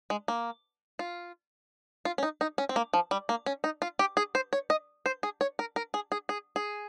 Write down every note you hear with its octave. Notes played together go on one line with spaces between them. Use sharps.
G#3
A#3
F4
F4
C#4
D#4
D#4
C#4
C4
A#3
F3
G3
A#3
C#4
D#4
F4
G4
G#4
C5
C#5
D#5
C5
G#4
C#5
A#4
A#4
G#4
G#4
G#4
G#4